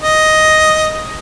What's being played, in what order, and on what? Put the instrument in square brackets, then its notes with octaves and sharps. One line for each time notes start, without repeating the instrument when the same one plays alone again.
[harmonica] D#5